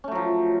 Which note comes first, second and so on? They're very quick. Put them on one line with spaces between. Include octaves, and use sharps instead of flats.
C#4 A3 F#3 F3